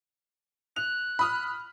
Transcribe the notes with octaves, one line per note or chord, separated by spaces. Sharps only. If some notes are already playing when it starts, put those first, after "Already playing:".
F#6 F7
B5 D#6 F6